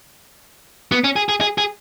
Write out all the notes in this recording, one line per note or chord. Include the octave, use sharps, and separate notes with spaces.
B3
C#4
G#4
G#4
G#4
G#4